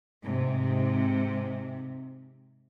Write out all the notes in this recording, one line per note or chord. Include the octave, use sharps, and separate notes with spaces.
G#2 C3